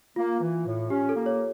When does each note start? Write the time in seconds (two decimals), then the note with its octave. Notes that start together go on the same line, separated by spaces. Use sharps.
0.16 A#3 F4
0.41 E3
0.66 A2
0.90 C#4 G4
1.09 A4
1.15 A#3
1.26 C#5